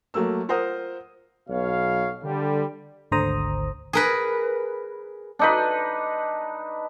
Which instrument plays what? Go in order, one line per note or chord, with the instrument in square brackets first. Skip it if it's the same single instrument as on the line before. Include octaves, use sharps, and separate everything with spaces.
[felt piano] F#3 A3 A#3 E6
F4 A#4 C5 F#5 A#5 D#6
[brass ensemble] B1 B2 C#5 F5
D3 G3
[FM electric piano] G#1 D2 D3 C5 A#5 D#6
[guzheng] G#4 A#4 B4
[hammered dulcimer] D4 D#4 B4